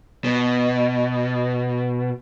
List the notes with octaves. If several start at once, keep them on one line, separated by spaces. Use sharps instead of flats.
B2